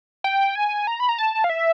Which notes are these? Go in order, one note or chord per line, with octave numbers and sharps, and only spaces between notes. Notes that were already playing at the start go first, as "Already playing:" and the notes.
G5
G#5
A#5
B5
A#5
A5
F5
E5